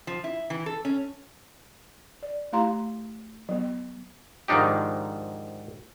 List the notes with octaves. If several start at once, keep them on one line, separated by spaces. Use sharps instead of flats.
F3
E4
E3
A4
C#4
D5
A3 E4 G4 F5 A#5 C6
F#3 B3
G#2 D#3 F3 D4 D#4 G4